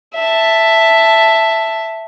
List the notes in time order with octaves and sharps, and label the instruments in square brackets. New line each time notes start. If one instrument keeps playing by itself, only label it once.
[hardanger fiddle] E5 A5